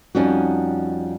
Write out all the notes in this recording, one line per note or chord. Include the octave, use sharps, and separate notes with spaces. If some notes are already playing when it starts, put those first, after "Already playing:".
F2 G3 C#4 D#4 F#4